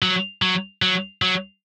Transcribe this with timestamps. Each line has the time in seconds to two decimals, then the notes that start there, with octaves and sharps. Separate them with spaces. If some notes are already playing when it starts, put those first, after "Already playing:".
0.02 F#3
0.42 F#3
0.82 F#3
1.22 F#3